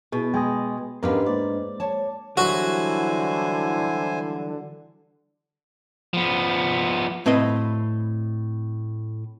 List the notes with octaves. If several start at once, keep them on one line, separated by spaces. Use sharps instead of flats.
B2 E4 G#4
G#3 G5 G#5 D#6
E2 G#2 C#4 D4 G4 A#4 B4 F5
G#3 A#3 C5 D5
C#5 A5
D3 E3 F#3 G3 E4 F#4 C5 G#5
F3 B3
A2 C4 B4 D#5